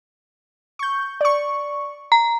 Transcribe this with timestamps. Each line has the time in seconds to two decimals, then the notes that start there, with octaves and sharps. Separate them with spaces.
0.79 C#6 G6
1.21 D5 C#6
2.12 A#5